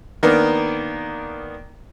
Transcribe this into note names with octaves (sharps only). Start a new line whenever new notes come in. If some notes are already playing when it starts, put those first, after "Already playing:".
D#3 A#3 B3 D4 A#4